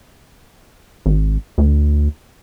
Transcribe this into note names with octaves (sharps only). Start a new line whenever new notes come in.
G#1
D2